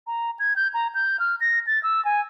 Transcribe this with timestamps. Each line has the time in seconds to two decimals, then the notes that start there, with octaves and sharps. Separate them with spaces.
0.07 A#5
0.39 G#6
0.56 G6
0.74 A#5
0.95 G6
1.20 F6
1.41 A#6
1.67 A6
1.83 E6
2.05 G#5